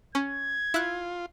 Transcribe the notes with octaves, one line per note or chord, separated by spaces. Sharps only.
C#4 G#6
E4 F4 F#6